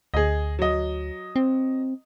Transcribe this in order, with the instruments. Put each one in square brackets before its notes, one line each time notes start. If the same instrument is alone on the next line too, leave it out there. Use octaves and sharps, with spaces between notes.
[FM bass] D2 [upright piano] G#4 D#5
[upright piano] F#3 D#5
[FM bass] C4